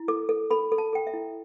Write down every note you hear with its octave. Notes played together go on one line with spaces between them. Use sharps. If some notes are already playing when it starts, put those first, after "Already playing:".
Already playing: E4
A4 D6
A4
A4 B5
A4
A5
A4 G5
E5
E4